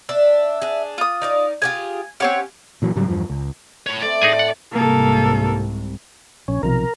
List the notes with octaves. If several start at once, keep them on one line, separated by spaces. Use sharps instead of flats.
D4 E5
D4 G#4
F4 D#6
D#4 A#4 D5
F4 G4 G#4 G#5
C4 C#4 G4 C#5 F5 F#5
A#2 E3 F#3
G#2 C#3 F#3 G3
E2 G2 F3
C#2
A2 C#5
A3 C4 D5
A2 D#4 G#4 G#5 A5
F#5
C2 G#2 C3 A#3 A4
A#1 C#4
B1 C3 F3 A#4